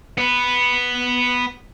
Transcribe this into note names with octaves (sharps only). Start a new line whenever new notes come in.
B3 B4